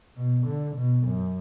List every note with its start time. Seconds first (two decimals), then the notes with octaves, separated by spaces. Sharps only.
0.17 B2
0.46 D3
0.75 B2
1.03 F#2